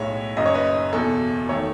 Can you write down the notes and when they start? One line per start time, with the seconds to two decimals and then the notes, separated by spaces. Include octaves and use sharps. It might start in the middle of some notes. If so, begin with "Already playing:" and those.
Already playing: B1 A2 G#3 C#5 E5
0.37 F#1 F#2 C#3 D#5
0.46 C#5
0.54 B4 D#5
0.92 E1 E2 B2 A4
1.48 E1 D#3 A3 A4 C#5